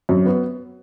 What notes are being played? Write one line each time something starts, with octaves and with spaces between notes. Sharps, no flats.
F#2
B3